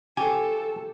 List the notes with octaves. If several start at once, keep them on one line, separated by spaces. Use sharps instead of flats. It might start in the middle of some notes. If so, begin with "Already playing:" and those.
C#3 F3 G4 A4 G#5